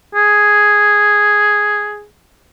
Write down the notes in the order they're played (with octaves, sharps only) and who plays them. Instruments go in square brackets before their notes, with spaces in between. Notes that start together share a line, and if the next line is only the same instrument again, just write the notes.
[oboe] G#4